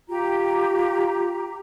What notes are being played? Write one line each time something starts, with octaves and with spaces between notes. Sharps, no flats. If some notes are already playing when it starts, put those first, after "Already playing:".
F4 G4 A#5